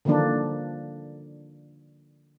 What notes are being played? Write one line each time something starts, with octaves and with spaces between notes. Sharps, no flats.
D3 D#3 F3 A#3 D4